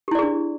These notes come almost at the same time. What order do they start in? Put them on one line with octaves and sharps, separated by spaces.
G4 E4 D5 G#4 D4